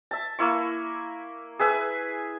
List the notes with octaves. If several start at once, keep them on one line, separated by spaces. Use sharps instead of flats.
E5 A5
A#3 E4 C#6
G#4 B4 E5 G#5